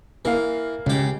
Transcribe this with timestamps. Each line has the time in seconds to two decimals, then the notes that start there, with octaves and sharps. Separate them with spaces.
0.25 E3 A#3 F5
0.86 C#2 C#3 G4